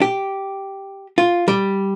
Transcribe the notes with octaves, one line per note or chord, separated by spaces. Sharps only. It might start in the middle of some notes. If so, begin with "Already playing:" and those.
G4
F4
G3